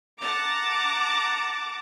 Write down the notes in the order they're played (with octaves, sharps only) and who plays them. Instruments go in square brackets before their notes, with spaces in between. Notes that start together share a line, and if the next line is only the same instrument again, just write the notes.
[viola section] F#5 A5 A#5 [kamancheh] D6